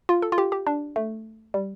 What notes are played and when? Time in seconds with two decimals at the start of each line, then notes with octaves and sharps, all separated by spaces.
0.09 F4
0.22 A4
0.32 F4
0.38 G4
0.52 G4
0.67 D4
0.96 A3
1.54 G3